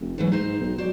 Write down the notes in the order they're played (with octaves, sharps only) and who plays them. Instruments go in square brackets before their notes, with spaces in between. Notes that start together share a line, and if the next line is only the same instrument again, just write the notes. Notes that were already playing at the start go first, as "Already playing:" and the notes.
[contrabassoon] F1
[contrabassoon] G#2 [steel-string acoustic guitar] E3 F#3 A3
[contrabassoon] G#2 [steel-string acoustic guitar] D#4 C5
[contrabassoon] B1
[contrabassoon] F#3 [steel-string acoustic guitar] C5 D5